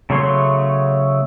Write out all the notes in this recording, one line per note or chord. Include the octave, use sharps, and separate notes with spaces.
C#3 F#3 A3 C#5 C6